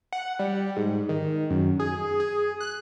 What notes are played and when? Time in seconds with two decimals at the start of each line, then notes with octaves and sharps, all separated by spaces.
0.12 F#5
0.39 G3
0.76 G#2
1.09 D#3
1.50 F#2
1.80 G#4
2.20 G#4
2.61 F#6